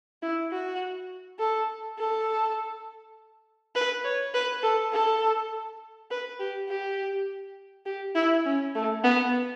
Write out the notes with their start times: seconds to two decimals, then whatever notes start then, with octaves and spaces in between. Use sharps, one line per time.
0.22 E4
0.51 F#4
1.40 A4
1.99 A4
3.75 B4
4.04 C#5
4.34 B4
4.63 A4
4.93 A4
6.10 B4
6.39 G4
6.69 G4
7.86 G4
8.15 E4
8.45 C#4
8.75 A3
9.04 B3